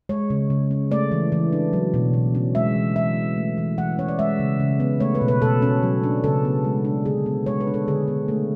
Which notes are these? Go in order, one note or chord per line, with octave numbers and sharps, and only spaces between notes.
G#3 C#5
C#3
C#3
C#4
A3 D5
E3
E3
D4
F#3
B2
B2
C#4
G#3 E5
E3
E3 E5
C#4
A3
E3
E3 F#5
C#4 C#5
D5
G#3 E5
C#3
C#3
B3
A3 C#5
B4
B2
B4
B2 A4
C#4
F#3
D4
C#3 A4
B3
G#3
D4
D3 G#4
B3
G#3 C#5
B4
D4
A4
D3 G#4
B3
A3